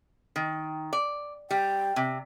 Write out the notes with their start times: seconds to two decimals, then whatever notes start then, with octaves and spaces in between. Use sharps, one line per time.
0.36 D#3
0.93 D5
1.51 G3 G5
1.96 C3